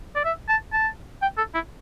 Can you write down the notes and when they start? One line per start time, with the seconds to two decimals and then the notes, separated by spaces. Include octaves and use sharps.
0.15 D5
0.25 E5
0.49 A5
0.73 A5
1.22 G5
1.38 A4
1.54 E4